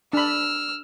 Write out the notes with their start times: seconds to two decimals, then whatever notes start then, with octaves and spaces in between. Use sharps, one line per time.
0.13 D4 B5 E6 F6